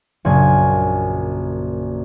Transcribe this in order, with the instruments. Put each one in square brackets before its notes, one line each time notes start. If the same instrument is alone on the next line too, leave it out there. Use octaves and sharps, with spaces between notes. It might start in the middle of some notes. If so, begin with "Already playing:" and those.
[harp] A#1 F#2 C#3 G#5